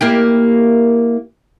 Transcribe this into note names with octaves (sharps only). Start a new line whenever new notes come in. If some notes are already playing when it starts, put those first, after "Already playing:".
A#3 E4 G4